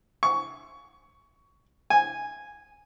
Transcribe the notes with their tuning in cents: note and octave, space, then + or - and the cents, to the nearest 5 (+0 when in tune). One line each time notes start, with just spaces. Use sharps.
C#6 +15
G#5 -10